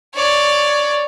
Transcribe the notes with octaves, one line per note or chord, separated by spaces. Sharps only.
C#5 D5